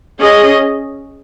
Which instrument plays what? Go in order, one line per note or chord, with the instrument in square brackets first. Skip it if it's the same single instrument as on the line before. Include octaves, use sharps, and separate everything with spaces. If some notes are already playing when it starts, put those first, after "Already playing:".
[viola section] C#4 G#4 D#5